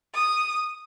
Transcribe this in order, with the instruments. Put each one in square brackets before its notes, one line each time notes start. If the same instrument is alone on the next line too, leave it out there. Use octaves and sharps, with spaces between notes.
[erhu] D#6